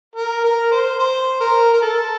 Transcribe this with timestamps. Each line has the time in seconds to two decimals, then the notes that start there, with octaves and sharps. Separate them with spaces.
0.16 A#4
0.44 A#4
0.72 C5
0.99 C5
1.41 A#4
1.73 A#4
1.82 A4